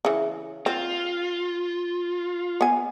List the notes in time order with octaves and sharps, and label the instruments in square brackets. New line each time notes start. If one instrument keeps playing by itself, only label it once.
[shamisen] C#3 E3
[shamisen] C4 [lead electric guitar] F4
[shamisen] B3 G#5